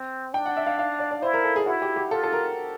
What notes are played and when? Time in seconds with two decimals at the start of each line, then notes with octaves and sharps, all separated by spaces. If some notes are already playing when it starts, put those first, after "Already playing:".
Already playing: C4
0.34 D4 G5
0.46 F#5
0.57 E5
0.67 F5
0.79 F5
1.00 D5
1.11 D5
1.22 E4 C5
1.33 A#4
1.44 A4
1.56 G#4
1.66 E4 F#4
1.82 G4
1.96 G4
2.11 F4 A4
2.23 A4
2.33 A#4